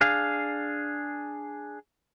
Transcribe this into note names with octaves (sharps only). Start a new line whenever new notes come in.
D4 G#4 F5